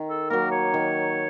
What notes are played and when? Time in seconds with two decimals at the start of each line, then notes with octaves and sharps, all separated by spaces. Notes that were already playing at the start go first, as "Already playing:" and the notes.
Already playing: D#3
0.09 A4
0.30 F#3 A#3 A#4
0.52 C#5
0.74 D#3